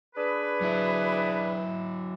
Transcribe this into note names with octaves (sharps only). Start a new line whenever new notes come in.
D4 G#4 B4
F#3 E4